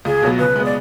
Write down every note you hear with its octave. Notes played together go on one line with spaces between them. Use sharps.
C#2 G#4
B2 F#3 B3
C#3 B4
G#3 B3
D5